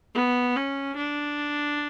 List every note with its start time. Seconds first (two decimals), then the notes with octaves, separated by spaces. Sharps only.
0.15 B3
0.56 C#4
0.96 D4